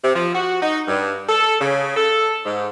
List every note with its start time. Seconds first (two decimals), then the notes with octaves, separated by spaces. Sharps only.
0.04 C3
0.16 F3
0.35 F#4
0.62 D#4
0.88 G2
1.29 A4
1.61 C#3
1.97 A4
2.45 G#2